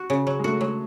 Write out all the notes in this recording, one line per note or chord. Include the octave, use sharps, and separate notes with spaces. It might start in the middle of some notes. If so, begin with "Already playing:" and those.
Already playing: F#4
C#3
F#3
G#3
A3 F#4
F#3 G#3